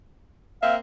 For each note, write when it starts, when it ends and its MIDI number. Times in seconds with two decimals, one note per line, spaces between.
0.62 0.76 58
0.62 0.76 60
0.62 0.76 76
0.62 0.74 77